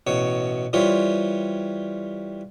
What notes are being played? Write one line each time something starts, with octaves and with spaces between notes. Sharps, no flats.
A1 B2 C#5
E3 G3 F4 C5 C#5